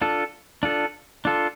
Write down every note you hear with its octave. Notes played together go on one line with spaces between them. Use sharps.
D4 F4 A4
D4 F4 A4
D4 F4 A4